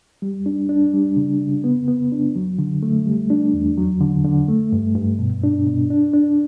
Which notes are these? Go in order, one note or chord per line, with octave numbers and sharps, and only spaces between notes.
G3
D4
D4
G3
C#3
C#3
B3
B3
D4
F#3
D3
A3
G3
D4
E2
F#3
D3
D3
A3
G2
G2
B2
D4
B2
D4
D4